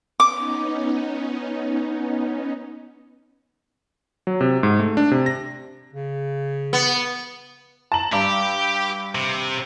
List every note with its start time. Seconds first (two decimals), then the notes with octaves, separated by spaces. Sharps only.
0.20 B3 C#4 D#4 D6
4.27 F#3
4.41 C3
4.63 G#2
4.80 A3
4.97 D4
5.11 C3
5.26 A#6
5.93 C#3
6.73 B3
7.92 A5 A#5 F#7
8.13 G2 G4
9.15 C3